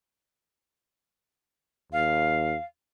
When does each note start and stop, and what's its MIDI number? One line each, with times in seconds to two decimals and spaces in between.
1.92 2.55 39
1.92 2.63 77